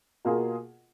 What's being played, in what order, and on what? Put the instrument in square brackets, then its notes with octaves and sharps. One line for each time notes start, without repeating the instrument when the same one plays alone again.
[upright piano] B2 A#3 F4 G#4